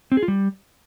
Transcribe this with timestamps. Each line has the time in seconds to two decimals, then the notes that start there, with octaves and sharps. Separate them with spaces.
0.12 C4
0.17 G#4
0.23 F4
0.28 G3